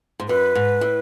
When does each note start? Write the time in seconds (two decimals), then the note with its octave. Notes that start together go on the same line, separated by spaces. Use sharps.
0.20 G#2
0.29 F#2 B4
0.55 G#2
0.81 A2